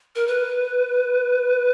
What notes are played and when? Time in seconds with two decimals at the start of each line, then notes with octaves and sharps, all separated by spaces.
0.15 A#4
0.27 B4